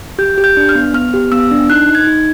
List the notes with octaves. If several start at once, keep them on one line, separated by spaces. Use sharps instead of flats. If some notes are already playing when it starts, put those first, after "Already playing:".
G4 G6
G4
G6
D4
F6
B3
B3 F6
G4
B3 E6
D4
D#4 F#6
D#4
G#6
D#4